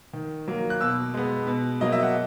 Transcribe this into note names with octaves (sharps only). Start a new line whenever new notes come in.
D#3
F#3 A#3
F#6
B2 E6
G#3 B3
B2
F#3 A#3 D#5
E5
F#5